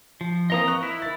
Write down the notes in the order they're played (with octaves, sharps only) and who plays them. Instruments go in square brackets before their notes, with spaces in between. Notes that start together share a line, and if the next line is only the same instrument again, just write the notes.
[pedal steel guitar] F3
[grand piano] E3 A#3 C4 [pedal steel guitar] D#5 A#5 D#6
[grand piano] C#6 F#6
[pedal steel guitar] E4
[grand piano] D#3 A6